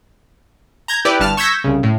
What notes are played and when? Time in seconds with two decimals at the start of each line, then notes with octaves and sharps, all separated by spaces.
0.88 A#5 G6 G#6
1.05 E4 G4 B4 D5
1.20 G1 G2 A5 F6
1.37 C#6 E6 G6 G#6 A#6 B6
1.64 C2 C#3
1.83 A2